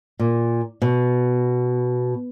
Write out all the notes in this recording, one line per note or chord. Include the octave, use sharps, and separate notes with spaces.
A#2
B2